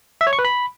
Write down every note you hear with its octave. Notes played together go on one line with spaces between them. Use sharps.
E5
C#5
C#6
B4
B5